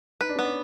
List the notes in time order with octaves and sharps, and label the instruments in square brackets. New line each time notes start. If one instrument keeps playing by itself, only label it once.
[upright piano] D#4 [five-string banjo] B4
[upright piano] D4
C#4
[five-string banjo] B3
[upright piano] D4